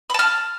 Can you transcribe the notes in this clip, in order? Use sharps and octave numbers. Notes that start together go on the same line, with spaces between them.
A5 B5 F6